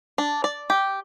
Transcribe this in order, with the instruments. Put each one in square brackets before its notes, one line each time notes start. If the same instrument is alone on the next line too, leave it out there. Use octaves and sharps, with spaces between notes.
[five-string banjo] D4
D5
G4